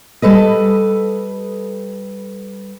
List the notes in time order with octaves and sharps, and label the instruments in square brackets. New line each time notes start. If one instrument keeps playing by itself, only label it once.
[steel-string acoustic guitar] G3 A4 B4 D#5